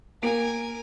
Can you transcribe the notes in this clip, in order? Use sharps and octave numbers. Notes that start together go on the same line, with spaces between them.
A#3 A#4 G#5 D7